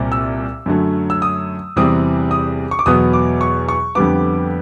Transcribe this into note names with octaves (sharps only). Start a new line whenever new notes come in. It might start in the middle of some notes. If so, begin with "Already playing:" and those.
Already playing: C2 A#2 G3 C4
E6
F#2 D3 F#3 A3
E6
D#6
E2 C3 E3 G3 C4 D#6
D#6
C#6
D6
E2 B2 F#3 B3 D#6
D6
C#6
C#6
F2 D3 G3 B3 D6